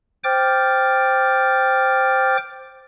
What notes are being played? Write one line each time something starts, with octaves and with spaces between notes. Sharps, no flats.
C5 G5 D6 F6 G6 A6